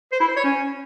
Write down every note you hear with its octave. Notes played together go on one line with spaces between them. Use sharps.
C5
E4
C5
C#5
C#4